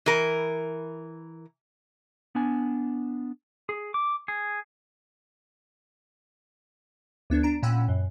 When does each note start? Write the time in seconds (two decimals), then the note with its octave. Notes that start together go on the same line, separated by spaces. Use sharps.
0.06 E3 A#4
2.35 B3 D4 G#5
3.69 G#4
3.94 D6
4.28 G#4
7.30 D2 B3 D4 G#6
7.43 D4 A#5 D7
7.63 A#2 C#4 F#5 G5 B5 E6
7.88 F#2